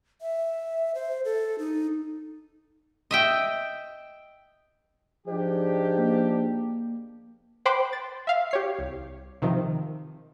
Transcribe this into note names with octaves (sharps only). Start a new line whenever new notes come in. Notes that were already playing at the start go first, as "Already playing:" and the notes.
E5
C5
A4
D#4
D#5 E5 G5
G#2 F3 D4 G4
A#3
C5 G5 B5 C6 D6 F#6
A6
E5 F5
G4 C#5 C7
C2
C3 D#3 F3